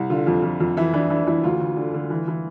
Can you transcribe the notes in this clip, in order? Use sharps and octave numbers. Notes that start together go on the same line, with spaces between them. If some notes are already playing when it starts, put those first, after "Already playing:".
Already playing: C2
D3 F4
F2
F2
F2
E3 E4
E3 D4
E3 D4
E3 E4
D2 F4
D2
D3
D3
E3
E3